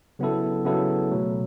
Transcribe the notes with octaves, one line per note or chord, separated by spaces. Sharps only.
C#3 F#3 B3 E4 A4
C#3 F#3 B3 E4 A4
B2 F#3 A3